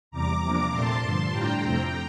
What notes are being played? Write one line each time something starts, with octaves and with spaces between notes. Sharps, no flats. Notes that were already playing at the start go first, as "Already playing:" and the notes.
E2 C3 G3 A#5 D6
C3 F3 A#3 D4
A#2 A3 C4 A5 C6
G2 D3 F3
A2 G3 D4 F4 G5 A#5
F2 C3 F3 A3 C4